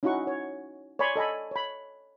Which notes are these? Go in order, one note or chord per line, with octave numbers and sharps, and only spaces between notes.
C#4 D#4 E4 F#4 F#5 C#6
C#5
C#5 D5 G#5 B5 C6
A4 D#5 G#5 B5
C#5 B5